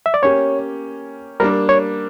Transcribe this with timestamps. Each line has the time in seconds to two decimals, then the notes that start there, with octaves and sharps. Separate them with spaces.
0.06 E5
0.14 D5
0.22 A#3 C#4 G4 C#5
1.40 G3 A#3 D4 A#4
1.69 C#5